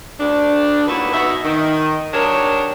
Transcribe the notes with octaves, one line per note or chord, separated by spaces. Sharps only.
D2 D4
D#2 E4 F#4 B4
B2 D#4 F#4 E5
D#3
F#3 D4 G4 G#4 A#4 C#5